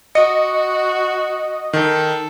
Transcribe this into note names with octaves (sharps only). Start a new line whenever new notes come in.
F#4 D#5 C#7
D#3 A4